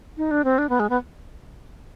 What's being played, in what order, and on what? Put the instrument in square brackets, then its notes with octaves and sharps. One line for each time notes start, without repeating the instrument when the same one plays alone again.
[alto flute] D#4
D4
C4
D4
B3
G#3
B3